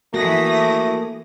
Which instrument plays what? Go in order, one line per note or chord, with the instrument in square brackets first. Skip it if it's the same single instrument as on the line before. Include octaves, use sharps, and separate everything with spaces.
[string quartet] E3 D#6 A#6 [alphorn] A3 [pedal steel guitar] A#3 F#5 G#5 [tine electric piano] F#4